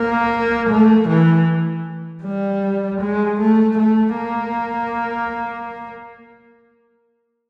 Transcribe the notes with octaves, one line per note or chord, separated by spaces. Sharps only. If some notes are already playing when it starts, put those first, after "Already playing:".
Already playing: A#3
A3
E3
G3
G#3
A3
A3
A#3